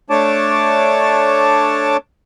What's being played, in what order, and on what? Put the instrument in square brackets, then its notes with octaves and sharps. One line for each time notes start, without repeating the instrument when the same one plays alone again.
[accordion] A3 D4 C#5 A5 D6